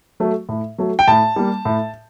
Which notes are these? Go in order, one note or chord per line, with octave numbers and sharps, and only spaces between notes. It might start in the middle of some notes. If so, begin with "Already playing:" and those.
F#3 A3
A2
F#3 A3
G5
A2 A5
G3 A#3
A2